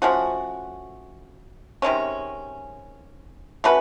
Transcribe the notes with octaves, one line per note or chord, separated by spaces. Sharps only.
F3 A3 C#4 F#4
C3 D#3 G#3 C#4
A3 C#4 F#4 B4